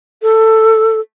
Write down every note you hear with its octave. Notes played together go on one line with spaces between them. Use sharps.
A4